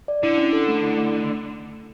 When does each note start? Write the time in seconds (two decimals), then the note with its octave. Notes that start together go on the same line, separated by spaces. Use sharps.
0.08 D5
0.23 D3 E4
0.38 C#4
0.53 A4
0.68 A3
0.83 E4
0.98 A3